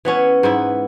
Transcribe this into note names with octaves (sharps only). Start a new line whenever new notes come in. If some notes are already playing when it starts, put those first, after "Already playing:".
E3 B3 C#4
G#2 B3 E4